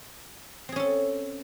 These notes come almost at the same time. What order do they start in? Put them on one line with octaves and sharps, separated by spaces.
C4 G#4 C#4 A4